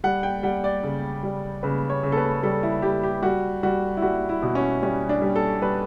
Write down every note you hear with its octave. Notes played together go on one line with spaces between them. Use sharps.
G3 F#5
G5
G3 F#5
D5
C#3
G3
C#3 B4
C#5
C#3
A4
B4
G3 A4
E4
G3 G4
G4
G3 F#4
G3 F#4
E4
G3 F#4
E4
B2
C#4
G3 C#4
D4
G3
A4
G3 B4